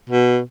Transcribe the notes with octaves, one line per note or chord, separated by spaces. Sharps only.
B2